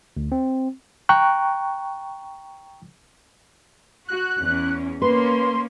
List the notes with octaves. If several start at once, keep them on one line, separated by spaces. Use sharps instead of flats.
D2
C4
G5 A#5 C#6 F#6
F#4 F#6
E2 C#4
A#3 C#4 B4 C6